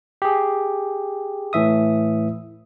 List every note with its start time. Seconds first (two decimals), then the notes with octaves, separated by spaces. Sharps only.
0.22 G4 G#4
1.53 A2 E3 E5 D#6